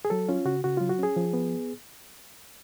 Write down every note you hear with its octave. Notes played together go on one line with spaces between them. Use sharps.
G#4
F#3 A4
C#4 F4
C#3 F#4
C#3 F#4
F#3 F4
F#4
C#4 G#4
F3
B3